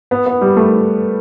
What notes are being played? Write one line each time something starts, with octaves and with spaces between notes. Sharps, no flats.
B3
B3
G3
A3